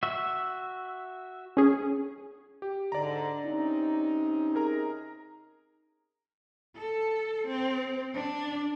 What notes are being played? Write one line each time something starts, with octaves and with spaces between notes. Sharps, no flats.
F#4 E5
C#4 G#4
G4
G#2 D3 D5 A#5
C3 C#4 D#4
G#4 A#4 A#5
A4
C4
D4